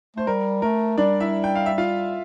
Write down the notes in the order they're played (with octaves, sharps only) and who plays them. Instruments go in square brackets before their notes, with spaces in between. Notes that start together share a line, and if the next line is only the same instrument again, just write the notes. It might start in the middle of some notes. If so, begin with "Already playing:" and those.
[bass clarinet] A3 [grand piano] C5
[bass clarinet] G3 [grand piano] A#4
[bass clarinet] A3 [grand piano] A#4
[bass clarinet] G3 [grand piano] D4 D5
[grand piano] E4 E5
G5
F5
E5
F4 F5